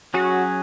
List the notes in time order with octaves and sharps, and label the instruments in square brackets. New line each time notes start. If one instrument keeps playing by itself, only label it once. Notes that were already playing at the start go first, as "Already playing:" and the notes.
[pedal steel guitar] F#3 C#4 G#4 [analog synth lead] F#4